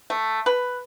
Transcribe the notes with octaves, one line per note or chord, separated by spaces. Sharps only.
A3
B4